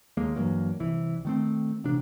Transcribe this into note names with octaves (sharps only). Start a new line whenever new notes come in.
D#2 G#3 A#3
G2 E3 F#3 A#3
C2 E3
D#3 A3 C4
A1 C3 D4